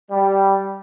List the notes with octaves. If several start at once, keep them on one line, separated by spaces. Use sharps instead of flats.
G3